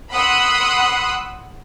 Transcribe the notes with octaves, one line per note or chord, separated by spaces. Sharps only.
F#5 B5 C6 D#6 E6 F#6